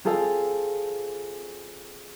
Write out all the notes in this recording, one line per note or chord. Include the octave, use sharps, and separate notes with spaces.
C4 F4 G#4 A4 F5